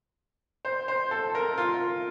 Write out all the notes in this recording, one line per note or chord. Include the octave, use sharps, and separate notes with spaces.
C5
C5
A4
A#4
F4